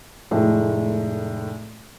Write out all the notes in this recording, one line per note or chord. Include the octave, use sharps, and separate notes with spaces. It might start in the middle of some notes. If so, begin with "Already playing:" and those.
F1 A2 G#3